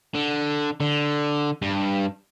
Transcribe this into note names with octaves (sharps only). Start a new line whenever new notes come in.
D3
D3
G2